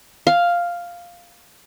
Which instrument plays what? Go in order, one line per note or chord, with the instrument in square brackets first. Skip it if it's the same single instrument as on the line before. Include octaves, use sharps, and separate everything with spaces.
[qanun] F5